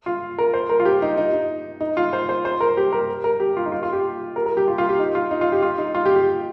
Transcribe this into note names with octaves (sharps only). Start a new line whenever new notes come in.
F4
A#4
C5
A#4
F4
G4
D#4
D#4
D#4
D#4
F4
C5
C5
C5
A#4
G4
A#4
A#4
G4
F4
D#4
F4
F4
G4
A#4
A#4
G4
F4
F4
G4
D#4
F4
D#4
F4
G4
F4
D#4
F4
G4
G4